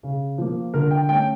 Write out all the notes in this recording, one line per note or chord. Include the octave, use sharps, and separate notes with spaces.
C#3
F3 A#3
D3 A#4
G5
A3 C#4 G5